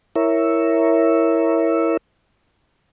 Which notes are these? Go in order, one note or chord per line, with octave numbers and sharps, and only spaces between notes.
E4 A#4 C#5 E5